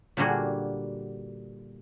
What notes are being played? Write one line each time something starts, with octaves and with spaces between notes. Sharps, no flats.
A#2 D3 G3 A#3 F#4 G#4